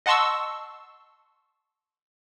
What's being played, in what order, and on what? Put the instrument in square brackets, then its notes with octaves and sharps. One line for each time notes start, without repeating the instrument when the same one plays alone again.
[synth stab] D#5 F#5 A5 C6 C#6 E6